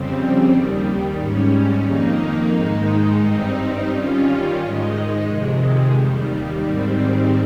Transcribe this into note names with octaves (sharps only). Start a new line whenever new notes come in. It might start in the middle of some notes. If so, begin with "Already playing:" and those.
Already playing: F2 C#3 G3 C4
D#2 D#3 G3
G#2 G3 C#4
F2 D#3 A#3 D#4
G#2 D#3 G#3 D#4
G2 G3 C4 D#4
D#3 G3 C#4 F4
G#2 D#3 G#3 D#4
F2 C3 D#3 G#3
D#2 D#3 G3
G#2 D#3 G3 C4